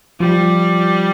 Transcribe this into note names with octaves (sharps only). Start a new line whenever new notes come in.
F3 G3